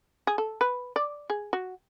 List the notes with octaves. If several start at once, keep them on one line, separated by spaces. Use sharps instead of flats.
G#4
A4
B4
D5
G#4
F#4